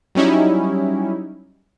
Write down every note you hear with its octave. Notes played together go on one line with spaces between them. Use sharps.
F#3 G3 C#4 D#4 E4